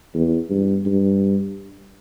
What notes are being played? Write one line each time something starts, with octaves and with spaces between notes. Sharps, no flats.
E2
G2
G2